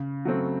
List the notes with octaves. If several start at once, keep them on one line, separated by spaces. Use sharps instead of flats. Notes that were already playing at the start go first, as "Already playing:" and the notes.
Already playing: C#3
F#3 A3 C4